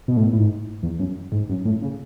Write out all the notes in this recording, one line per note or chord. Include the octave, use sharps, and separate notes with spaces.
B2
A2
A2
G#2
E2
F#2
G#2
F#2
A2
C#3